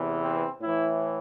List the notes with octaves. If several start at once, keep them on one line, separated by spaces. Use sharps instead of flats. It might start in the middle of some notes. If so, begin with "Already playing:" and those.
Already playing: E2 C3 E3
C4
A2 E3 E4